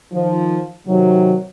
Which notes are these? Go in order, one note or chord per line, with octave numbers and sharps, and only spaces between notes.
D#3 F3
C3 D#3 F#3